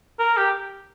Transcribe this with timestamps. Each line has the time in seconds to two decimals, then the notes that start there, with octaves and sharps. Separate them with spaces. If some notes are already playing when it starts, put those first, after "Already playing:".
0.19 A#4
0.37 G4